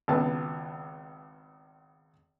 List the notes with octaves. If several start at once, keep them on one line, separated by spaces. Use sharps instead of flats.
G#1 C#2 B3 A5